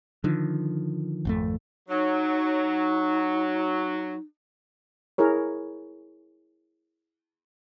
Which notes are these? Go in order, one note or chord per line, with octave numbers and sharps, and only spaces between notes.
D3 D#3 F3
G#1 F2 A3
F#3 D#4
E4 G#4 A#4 C#5